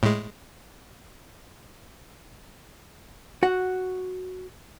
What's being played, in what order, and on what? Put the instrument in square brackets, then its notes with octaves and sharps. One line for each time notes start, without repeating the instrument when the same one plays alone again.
[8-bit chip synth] A2 G#3
[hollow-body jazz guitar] F#4 F#5